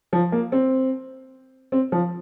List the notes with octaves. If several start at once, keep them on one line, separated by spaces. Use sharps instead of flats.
F3
A#3
C4
C4
F3